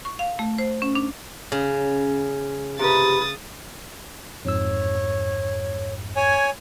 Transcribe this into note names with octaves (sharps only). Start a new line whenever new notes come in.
C#6
F5
A3
C5
C#4
D4
C#3 C#4
C3 G4 B4 D#6 A6
F2 G#2 C#5 E6
C#5 G#5